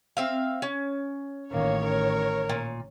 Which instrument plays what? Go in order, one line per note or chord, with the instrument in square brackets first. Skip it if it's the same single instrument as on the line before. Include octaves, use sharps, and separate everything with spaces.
[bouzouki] C4 E5 F5
C#4
[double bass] A1 D#3 [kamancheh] A#3 [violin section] C#5
[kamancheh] A#4
[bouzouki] A#2